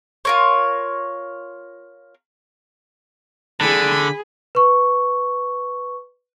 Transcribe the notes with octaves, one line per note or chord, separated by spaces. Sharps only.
F4 A#4 C#5
D3 G#4 B5
B4 C#6